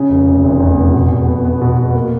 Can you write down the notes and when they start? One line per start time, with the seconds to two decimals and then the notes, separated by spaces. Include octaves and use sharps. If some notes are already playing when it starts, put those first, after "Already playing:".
Already playing: C#3
0.09 F1
0.27 F1
0.43 F1
0.60 E2
0.77 F1
0.93 B2
1.11 B2
1.27 B3
1.45 B3
1.61 B2
1.78 B2
1.94 A#3